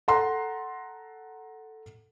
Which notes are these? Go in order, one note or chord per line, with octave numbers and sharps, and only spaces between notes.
A4 F#5 A#5 C6